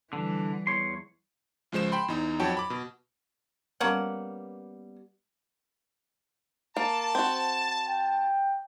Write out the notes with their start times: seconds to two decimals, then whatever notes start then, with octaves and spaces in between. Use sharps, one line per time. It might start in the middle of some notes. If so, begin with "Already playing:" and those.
0.13 D3 E3 G3
0.67 E2 C#5 C6
1.72 C#2 F3 G#3 C5 E7
1.92 G5 B5 C6
2.08 E2 D#4
2.39 F2 F#3 F#4 C#5 G5 A5
2.57 B5 D6
2.70 B2
3.80 G3 A#3 B3 C#4 F#5
6.76 A#3 A5
7.15 C4 F#4
7.88 G5